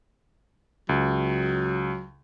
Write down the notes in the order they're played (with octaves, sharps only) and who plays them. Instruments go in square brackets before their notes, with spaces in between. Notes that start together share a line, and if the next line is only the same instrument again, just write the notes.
[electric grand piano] C#2 [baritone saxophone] F#3